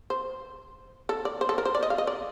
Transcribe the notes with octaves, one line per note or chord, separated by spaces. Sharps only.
C5
A4
D5
C5
A4
A#4
C5
D5
D#5
F5
D#5
D5